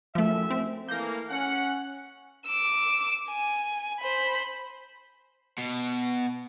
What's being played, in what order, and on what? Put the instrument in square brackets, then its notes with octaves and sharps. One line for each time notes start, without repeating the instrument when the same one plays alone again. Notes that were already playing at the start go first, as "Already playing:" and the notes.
[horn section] F#2 A2 E5 [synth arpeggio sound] F3 A3
[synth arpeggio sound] C4
[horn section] E3 A3 A#3 [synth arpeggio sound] G6 A#6
[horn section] C#4 F#5
[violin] D6 E6
G#5
C5 B5
[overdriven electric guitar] B2